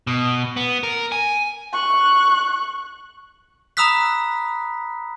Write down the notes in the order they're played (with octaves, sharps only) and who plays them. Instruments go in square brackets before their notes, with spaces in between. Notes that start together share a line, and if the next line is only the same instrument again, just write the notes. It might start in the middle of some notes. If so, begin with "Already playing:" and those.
[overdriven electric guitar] B2
B3
A#4
G#5
[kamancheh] C#6 F#6
[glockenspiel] A#5 B5 D#6 E6 F#6 B6